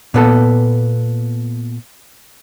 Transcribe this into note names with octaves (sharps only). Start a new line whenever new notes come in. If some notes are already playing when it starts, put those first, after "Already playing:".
A#2 B3 A4